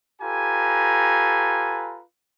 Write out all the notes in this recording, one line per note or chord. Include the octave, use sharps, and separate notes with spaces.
F4 G4 A4 B4 G#5 A#5